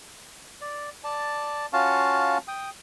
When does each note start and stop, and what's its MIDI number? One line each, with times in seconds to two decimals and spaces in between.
0.61 0.90 74
1.04 1.66 74
1.04 1.66 81
1.73 2.38 61
1.73 2.38 65
1.73 2.38 66
1.73 2.38 77
1.73 2.38 81
2.48 2.70 79
2.48 2.70 87